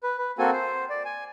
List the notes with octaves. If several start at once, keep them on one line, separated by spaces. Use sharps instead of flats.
B4
B4
A#3 C4 F#4 A4 G#5
C5
D5
G#5